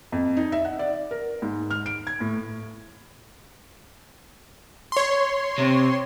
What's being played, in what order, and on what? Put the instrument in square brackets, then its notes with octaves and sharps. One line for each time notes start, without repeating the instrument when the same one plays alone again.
[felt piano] F2
D#4
E5
F#5
D5
A#4
G#2
F6
D7
G#6
A2
[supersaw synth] C#5 C6
[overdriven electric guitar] C3